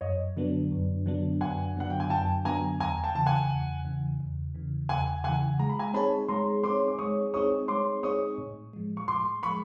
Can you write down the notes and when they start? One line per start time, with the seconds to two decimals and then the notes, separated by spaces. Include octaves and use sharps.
0.01 F#2 C#5 D#5
0.37 D3 F#3 B3 D4
0.71 F#2
1.06 D3 F#3 B3 D4
1.41 F#2 F#5 G#5
1.75 D3 F#3 B3 D4 F#5
1.90 G5
2.00 G#5
2.10 F#2 G5 A5
2.45 D3 F#3 B3 D4 G#5 A#5
2.80 E2 G#5 A#5
3.04 G5 A5
3.15 C#3 E3 A5
3.26 F#5 G#5
3.49 E2
3.85 C#3 E3
4.20 E2
4.55 C#3 E3
4.89 E2 F#5 G#5
5.24 C#3 E3 F#5 G#5
5.59 G#3 A#5
5.69 B5
5.79 G#5 A#5
5.94 C4 D#4 G#4 C#5 A5 B5
6.28 G#3 A#5 C6
6.63 C4 D#4 G#4 C#5 C6 D6
6.88 D6
6.99 G#3 C#6 D#6
7.34 C4 D#4 G#4 C#5 C#6 D#6
7.68 G#3 C6 D6
8.03 C4 D#4 G#4 C#5 C#6 D#6
8.38 A2
8.73 F3 G#3
8.97 C#6
9.08 A2 C6 D6
9.43 F3 G#3 B5 C#6